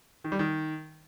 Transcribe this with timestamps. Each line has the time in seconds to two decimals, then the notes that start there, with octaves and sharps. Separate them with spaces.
0.24 D#3
0.32 G3
0.39 D#3